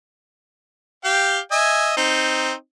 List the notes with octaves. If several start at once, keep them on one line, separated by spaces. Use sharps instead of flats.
G4 F5 G5
D#5 E5 G#5
C4 D#4